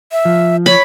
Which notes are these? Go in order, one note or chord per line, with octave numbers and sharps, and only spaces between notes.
E5
F3
C#5 B5